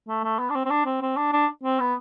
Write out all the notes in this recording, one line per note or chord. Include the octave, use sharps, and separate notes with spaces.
A3
A3
B3
D4
C4
C4
D4
C4
C4
D4
D4
C4
B3